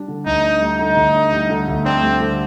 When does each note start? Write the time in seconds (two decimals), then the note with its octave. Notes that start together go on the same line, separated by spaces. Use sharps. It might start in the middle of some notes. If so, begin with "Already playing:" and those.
Already playing: G3 D4
0.08 D3
0.26 D2 D#4
0.44 D4
0.62 G3
0.79 D3 D#4
0.96 D2
1.15 D4
1.33 G3
1.50 D3
1.68 D2
1.85 C4 D4
2.03 G3
2.20 D3